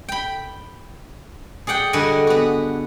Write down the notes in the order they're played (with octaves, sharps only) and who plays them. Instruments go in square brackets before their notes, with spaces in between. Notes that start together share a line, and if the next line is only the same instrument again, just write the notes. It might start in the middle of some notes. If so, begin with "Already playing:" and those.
[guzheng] G5 B5
G#4 D5 F#5 G5
D3 G3 F#4 D#5 F#5 G#5
B3 F#4